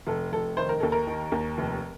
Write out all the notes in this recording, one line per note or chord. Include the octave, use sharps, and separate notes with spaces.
F1 A4
F1 A4
D#3 C5
A#4
D#2 A4
A#4
D#3
D#2
F1